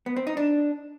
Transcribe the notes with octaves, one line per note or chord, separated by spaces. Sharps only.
B3
C4
D#4
D4